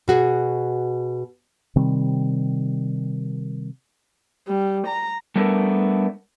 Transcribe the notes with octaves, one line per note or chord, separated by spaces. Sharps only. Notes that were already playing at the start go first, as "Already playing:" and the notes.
B2 F#4 G#4
C3 D#3 G3 C4
G3
A#5
G3 A3 B3 D4 A4 A#4